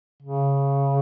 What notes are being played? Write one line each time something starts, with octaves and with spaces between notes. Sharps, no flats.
C#3